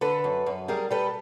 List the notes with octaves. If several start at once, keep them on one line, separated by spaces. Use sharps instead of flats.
D3 A4 B4
F#2
F#2
G3 G#4 A#4
G3 A4 B4